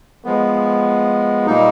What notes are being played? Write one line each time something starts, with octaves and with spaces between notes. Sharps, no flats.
F3 G#3 B3
A#2 G3 A#3 D#4